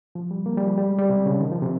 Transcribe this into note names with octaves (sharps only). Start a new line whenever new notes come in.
F3
G3
A#3
G3
F3
G3
G#3
G3
C3
C#3
D#3
F3
C3